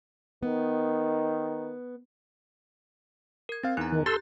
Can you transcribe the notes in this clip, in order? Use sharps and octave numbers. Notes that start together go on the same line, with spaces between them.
D#3 B3
A#4 G#6
C4 F5 A6
E2 D#4 A#5 F#6
D#3
G4 A4 C6 E6 G6 A6